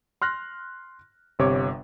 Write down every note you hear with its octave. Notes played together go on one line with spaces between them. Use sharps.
C6 F6 F#6 A#6
G1 C3 C#5 D6